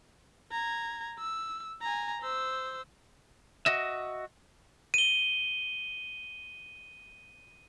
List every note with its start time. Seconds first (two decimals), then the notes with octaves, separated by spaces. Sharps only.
0.52 A#5 G#6
1.19 E6
1.81 G#5 A#5
2.22 C5 E6
3.66 F#4 D#5 E5
4.94 D#7 G7